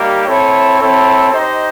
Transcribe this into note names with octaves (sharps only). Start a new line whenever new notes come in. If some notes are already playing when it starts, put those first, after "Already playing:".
Already playing: G3 A#3 D#4 G4
C4 E4 A4 C#5
C4 E4 A4 C#5
D#4 G4 C5 D#5